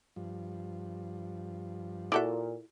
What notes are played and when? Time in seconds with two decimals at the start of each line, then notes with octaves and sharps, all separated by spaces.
0.16 G2 F3
2.12 A#2 E4 F#4 G4 A4 D5 E5